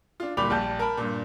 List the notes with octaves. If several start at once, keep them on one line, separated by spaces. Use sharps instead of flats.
D4 F4
D1 A#2 G3 B5 D6 F7
A#1 G3 A5 G6
A#4 A5 B5
G2 A#2